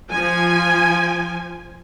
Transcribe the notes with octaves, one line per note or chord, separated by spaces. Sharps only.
F3 G#5